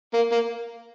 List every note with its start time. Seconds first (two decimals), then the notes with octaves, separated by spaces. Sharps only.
0.14 A#3
0.32 A#3